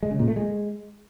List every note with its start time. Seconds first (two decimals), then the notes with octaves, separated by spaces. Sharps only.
0.03 G#3
0.11 C#3
0.19 A#2
0.28 A3
0.36 G#3